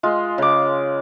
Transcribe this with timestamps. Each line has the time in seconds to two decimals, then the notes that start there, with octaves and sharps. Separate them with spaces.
0.03 G#3 F4
0.38 C#3 D6